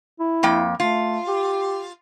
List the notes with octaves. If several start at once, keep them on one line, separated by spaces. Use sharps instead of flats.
E4
F2 A#3 G5
A3 F4
G4